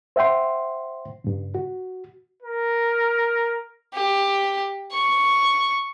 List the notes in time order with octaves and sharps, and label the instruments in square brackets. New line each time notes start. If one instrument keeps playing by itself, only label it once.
[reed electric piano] C5 E5 F#5 G5 C6
G2 C#3
F#4
[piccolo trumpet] A#4
[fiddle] G4
C#6